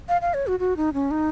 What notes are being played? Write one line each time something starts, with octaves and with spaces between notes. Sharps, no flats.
F5
F5
C#5
F#4
F#4
D#4
C#4
D#4